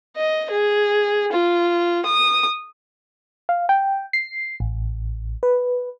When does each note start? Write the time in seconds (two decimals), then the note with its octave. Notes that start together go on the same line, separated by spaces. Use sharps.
0.17 D#5
0.50 G#4
1.32 F4
2.06 D#6
3.49 F5
3.69 G5
4.13 C7
4.60 A1
5.43 B4